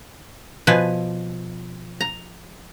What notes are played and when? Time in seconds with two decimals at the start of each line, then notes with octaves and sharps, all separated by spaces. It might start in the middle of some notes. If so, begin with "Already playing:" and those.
0.67 B2 F3 B4 G#5
2.01 A#5